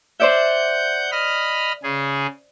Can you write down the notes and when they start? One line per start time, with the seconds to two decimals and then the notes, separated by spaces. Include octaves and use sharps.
0.20 C5 D5 E5 F#5 G6
1.12 D#5 B5 F6
1.83 C#3 G#4